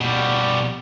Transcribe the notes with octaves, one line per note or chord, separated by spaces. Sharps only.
B2 G3